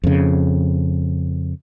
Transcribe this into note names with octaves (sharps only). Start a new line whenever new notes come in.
F2 C#3